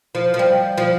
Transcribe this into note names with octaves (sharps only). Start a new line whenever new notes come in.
F3
F3
G3
F3